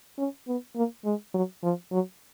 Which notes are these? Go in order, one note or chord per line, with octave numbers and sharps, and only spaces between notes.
C#4
B3
A#3
G#3
F#3
F3
F#3